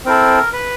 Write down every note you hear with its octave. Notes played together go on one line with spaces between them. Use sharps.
C4 E4 A4 A#4
B4